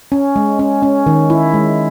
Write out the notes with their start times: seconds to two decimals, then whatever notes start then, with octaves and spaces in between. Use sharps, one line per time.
0.12 C#4
0.36 G#3
0.59 C#4
0.83 C#4
1.06 D#3
1.30 E4
1.54 G#3